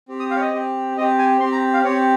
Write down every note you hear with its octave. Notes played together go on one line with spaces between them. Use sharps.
C4 G4
D#6
F5
C#5
D#5
C4 G4
C4 G4 D#5
G#5
C4 G4 C6
A#5
F5
C4 G4 C#5